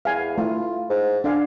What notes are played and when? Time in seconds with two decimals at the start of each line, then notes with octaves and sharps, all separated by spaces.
0.05 E2 F5 G#5
0.38 A3 E4 F4
0.90 G#2
1.24 D3 D4 F5 G#5